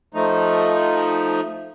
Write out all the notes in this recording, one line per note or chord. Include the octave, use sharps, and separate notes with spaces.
F3 A3 D#4